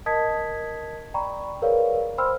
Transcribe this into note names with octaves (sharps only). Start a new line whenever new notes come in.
A#4 D#5 A5 D#6 G#6 B6
D5 G5 A#5 B5 C#6
G#4 A#4 B4 C#5 D5 F5
C5 G5 B5 C6 E6 F6